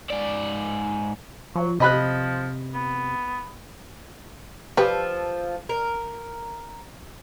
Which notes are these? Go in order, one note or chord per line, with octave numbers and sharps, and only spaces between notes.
G#2 D5
F3 F#3
C3 F3 D#5 B5 F#6
B3
F3 G4 A4 B4
A#4